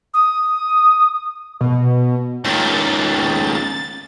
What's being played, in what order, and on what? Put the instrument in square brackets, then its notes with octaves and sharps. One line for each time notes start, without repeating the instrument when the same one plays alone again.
[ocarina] D#6
[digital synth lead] B2
[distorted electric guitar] C#2 D#3 [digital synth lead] A6